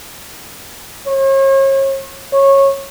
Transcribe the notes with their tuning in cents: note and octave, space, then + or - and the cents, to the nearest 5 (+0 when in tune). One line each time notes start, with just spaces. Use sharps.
C#5 -40
C#5 -15